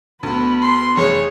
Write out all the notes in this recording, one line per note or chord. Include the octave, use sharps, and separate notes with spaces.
D2 D3 B3 B5
C6
F1 G#4 C#5